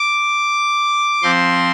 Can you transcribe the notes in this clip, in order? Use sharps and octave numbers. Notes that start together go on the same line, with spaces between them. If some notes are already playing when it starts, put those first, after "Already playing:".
Already playing: D6
F3 C4 C6